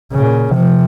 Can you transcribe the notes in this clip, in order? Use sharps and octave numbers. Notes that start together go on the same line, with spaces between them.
A#2 C#3
C3 F3